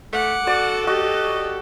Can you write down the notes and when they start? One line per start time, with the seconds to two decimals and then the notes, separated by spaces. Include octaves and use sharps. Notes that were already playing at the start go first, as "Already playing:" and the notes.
0.13 A3 F#5 D6
0.47 F#4 A4 D5
0.87 F#4 G4 D#5